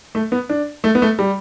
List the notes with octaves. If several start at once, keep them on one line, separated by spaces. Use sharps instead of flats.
A3
B3
D4
A3
B3
A3
G3